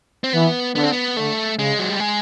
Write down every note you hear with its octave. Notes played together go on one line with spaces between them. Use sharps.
C4
E3 B3
D3 B3
C4
B3
D3 A3
C#3 G#3
F#3
G3
G#3